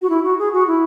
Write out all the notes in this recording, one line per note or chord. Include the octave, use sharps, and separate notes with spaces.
F#4
E4
F#4
G#4
F#4
E4